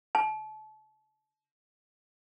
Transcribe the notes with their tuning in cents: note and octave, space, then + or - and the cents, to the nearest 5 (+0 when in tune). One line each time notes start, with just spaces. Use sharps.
A5 -35